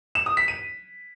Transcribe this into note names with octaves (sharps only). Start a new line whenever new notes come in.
E7
D#6
B6
D#7